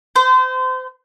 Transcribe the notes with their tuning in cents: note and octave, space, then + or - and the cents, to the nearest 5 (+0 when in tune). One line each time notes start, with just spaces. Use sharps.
C5 -30